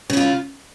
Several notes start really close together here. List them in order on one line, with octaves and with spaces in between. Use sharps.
C#3 E4 F4